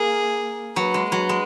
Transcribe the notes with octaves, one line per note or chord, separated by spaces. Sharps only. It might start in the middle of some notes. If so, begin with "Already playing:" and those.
Already playing: A#3 G#4
F#3 B4
G#3
F#3 B4
G#3